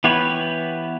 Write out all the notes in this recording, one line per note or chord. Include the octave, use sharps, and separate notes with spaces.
E3 B3 G4 B4 C#5